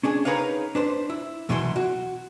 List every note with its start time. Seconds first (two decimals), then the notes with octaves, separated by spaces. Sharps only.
0.03 C#4 D4 G#4
0.25 D#4 G#4 A#4 B4 C#5 F5
0.75 D4 B4 C5
1.10 E4
1.49 C2 B2 E3 F#3 E4 C6
1.76 F#4